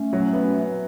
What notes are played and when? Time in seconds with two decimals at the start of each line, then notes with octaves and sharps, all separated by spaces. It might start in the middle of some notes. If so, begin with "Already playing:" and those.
Already playing: A3 C#4
0.13 F#3
0.33 B3